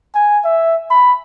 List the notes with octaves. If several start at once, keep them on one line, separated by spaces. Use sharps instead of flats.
G#5
E5
B5